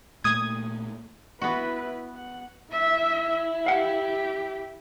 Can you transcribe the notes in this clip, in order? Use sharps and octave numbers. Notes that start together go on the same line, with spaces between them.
A#2 A3 D#6 G#6
B3 E4 F#4 B4
F#5
E4 E5
G4 F5 F#5